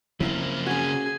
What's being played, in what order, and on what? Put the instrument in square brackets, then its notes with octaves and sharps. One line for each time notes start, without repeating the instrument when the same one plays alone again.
[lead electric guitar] C#3 A#3 [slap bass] F3 F#3 C4 [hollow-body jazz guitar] E4 E5 F5
[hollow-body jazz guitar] C#4 F#4 [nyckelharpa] G#4 G#5